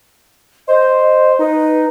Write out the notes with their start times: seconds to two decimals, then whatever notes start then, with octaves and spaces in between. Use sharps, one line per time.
0.68 C5 D#5
1.39 D#4 B4